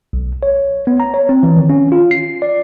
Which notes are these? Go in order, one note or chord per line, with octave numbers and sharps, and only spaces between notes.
B1
C#5
B3
A#5
C#5
C4
E3
D#3
C#4
F4
C7
D5